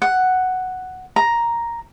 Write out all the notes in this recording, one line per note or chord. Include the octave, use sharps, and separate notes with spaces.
F#5
A#5